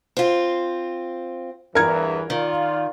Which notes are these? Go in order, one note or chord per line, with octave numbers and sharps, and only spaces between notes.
C4 F4
E2 G2 E3 A#4 G#6
D#3 F4 D5